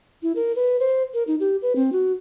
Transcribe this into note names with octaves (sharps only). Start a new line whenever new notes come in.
E4
A#4
B4
C5
A#4
D#4
G4
B4
C4
F#4